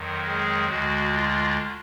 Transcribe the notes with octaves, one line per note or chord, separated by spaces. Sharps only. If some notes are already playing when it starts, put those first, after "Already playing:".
Already playing: F2 D#3 F#3
G#3 G#4
D2 D3 G#3 F#4
F4